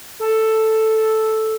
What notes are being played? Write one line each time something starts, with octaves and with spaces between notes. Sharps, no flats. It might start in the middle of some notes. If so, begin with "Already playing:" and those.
A4